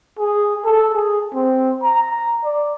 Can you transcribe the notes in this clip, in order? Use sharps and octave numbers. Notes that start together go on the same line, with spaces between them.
G#4
A4
G#4
C4
A#5
D5